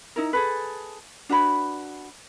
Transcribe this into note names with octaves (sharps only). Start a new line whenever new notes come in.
D#4 E4 A#4
G#4 A4 B4
D4 F#4 B4 B5